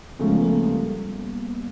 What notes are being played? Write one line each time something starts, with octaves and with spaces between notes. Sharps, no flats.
C#2 C#3 F3 A3 B3 C#4
A#3
G3